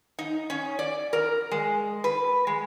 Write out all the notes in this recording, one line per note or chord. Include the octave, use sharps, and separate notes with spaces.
D#4
C#4
D5
A#4
G#3
B4
G#3